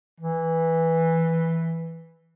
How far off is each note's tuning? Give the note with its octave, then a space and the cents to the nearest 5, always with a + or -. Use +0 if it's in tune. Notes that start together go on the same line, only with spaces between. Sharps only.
E3 -5